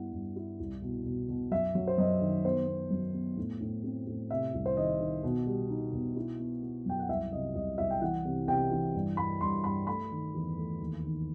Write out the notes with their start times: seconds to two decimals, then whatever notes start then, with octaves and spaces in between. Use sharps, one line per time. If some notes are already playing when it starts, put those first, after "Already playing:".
Already playing: G2 B3 E4 F#5
0.13 G2
0.36 E4
0.60 C2
0.82 B2
1.06 B2
1.29 B2
1.51 F#2 E5
1.75 F#3
1.87 C5
1.98 F#2 D#5
2.21 D#3
2.45 B3 C5
2.67 B3
2.91 F#2
3.14 B3
3.37 A2
3.61 A2
3.83 C4
4.07 A2
4.30 C3 E5
4.54 C2
4.66 C5
4.77 D#3 D#5
5.00 D#3
5.23 B2
5.46 G3
5.70 D#4
5.93 B2
6.16 E4
6.40 B3
6.63 B3
6.86 F#2 G5
6.99 F#5
7.09 C2 E5
7.32 C3 D#5
7.55 C2 D#5
7.78 C2 E5
7.90 G5
8.01 E3 F#5
8.25 C3
8.48 C3 G5
8.71 E3
8.95 G2
9.17 G2 B5
9.41 G2 C6
9.64 G2 B5
9.87 A3 B5
10.11 D#3
10.34 E2
10.58 A3
10.81 D#2
11.04 D#3